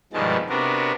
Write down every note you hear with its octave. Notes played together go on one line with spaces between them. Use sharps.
G2 B2 D#3 F3 G#3 A5
C3 B3 D4 F#4 A#4